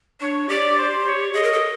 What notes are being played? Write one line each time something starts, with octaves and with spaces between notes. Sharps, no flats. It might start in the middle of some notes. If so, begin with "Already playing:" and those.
D4 C#5
G4 D5
C5
C#5
G#4 D#5
A#4
A4